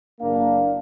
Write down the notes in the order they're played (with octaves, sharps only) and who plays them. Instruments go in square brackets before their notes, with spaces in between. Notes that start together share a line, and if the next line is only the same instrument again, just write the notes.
[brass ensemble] F#1 A#3 D4 F5